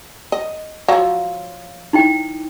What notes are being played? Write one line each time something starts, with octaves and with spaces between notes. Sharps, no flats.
D#5
F3 F#3 F5 E6
D#4 E4 G5